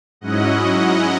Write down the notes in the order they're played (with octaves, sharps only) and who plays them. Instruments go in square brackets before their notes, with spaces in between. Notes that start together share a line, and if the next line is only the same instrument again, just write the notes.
[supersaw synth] G#2 F#3 C#4 E4 D#5 F#5